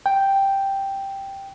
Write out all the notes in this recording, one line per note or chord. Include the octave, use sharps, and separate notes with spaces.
G5